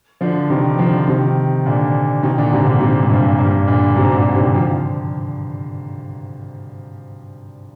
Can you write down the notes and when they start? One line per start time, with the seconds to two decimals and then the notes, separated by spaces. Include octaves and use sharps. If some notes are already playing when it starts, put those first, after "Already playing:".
0.21 D3 F3
0.50 C3 D#3
0.79 D3 F3
1.08 C3 D#3
1.66 A#2 D3
2.23 C3 D#3
2.38 A#2 D3
2.53 G#2 C3
2.66 A#2 D3
2.80 G#2 C3
3.03 G#2
3.09 G2 A#2
3.39 G2 A#2
3.67 A#2 D3
3.96 G#2 C3
4.11 C3
4.16 A#2 D3
4.35 C3 D#3
4.54 D3 F3